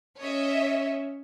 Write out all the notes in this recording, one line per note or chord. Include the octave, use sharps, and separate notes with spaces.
C#4 C#5 D#5 E5